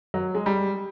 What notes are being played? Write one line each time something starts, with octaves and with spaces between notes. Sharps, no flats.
F#3
G#3
G3